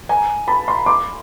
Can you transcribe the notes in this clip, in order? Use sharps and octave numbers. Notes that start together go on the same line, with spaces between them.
G#5 A#5
A5 B5
A#5 C6
C6 D6